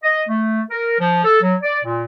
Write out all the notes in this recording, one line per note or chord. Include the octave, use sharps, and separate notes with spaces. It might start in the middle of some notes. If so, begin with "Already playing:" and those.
D#5
A3
A#4
F3
A4
F#3
D5
A#2